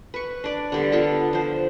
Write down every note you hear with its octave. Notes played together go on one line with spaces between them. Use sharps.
B4 C#6
D4 D5
D3 G3 B3
B3 F4 A4 A5
F3 C5